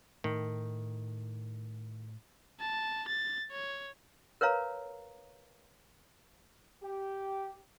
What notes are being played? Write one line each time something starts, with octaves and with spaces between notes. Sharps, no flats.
A2 D#3
A5
A6
C#5
A#4 B4 C#5 F5 A#5
G4